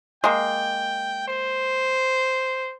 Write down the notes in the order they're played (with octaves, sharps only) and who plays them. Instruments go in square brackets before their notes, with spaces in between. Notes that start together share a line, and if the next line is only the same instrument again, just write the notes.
[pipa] G#3 A#3 [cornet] G5
[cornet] C5